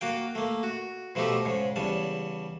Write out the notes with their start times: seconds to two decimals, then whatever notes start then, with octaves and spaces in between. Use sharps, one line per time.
0.01 A#3 F#4 F5 G5
0.35 A3 A#3
0.63 F#4
1.15 B2 F3 A3 D#4 G4 A4
1.45 G#2 C#3
1.76 E2 C#3 G3 A5